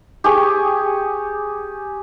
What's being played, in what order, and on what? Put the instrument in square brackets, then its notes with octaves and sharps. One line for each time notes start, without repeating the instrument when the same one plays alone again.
[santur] G4 G#4 C#6